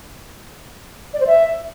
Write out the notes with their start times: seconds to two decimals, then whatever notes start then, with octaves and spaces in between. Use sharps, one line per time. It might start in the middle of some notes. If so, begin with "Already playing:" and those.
1.14 D5
1.20 C5
1.27 E5